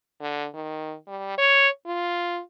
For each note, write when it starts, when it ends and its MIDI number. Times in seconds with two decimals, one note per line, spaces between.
0.21 0.47 50
0.54 0.95 51
1.08 1.36 55
1.38 1.68 73
1.87 2.40 65